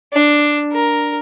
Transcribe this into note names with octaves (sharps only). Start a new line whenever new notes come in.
D4
A#4